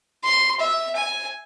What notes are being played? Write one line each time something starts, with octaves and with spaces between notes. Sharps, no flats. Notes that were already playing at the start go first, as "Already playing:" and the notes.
C6
E5
G#5